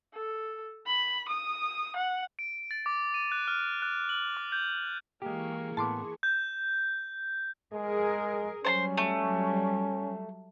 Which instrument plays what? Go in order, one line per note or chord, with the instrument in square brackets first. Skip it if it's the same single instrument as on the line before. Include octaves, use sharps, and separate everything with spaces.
[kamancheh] A4
B5
D#6
F#5
[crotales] D7
A6
D6
D#7
F#6
F6
F#6
F#7
D6
G6
[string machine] E3 G#4 C#6 [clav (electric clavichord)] G#3 G4 [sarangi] A#3
[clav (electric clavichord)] A2 B3 [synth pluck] A5 C6 D6
[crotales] G6
[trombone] G#3 [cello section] G#4 A#4
[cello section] F#3 G3 [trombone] C#4 [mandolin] C5 A5 C6
[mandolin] A3